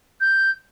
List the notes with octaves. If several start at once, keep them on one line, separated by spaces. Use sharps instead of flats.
G6